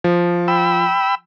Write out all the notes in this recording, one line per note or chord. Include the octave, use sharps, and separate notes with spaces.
F3
G5 B5 E6